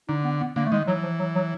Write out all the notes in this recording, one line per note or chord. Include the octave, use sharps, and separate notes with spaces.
D3 D#4
B3
B3
D3 A#3
A3
D#3 G#3
E3 F#3
F3
F#3
F#3